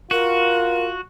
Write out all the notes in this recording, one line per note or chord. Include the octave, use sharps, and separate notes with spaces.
F4 F#4 A#4